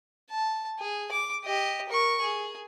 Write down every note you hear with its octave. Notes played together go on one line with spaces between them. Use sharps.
A5
G#4
D6
G4 D#5
A#4 C#6
G#4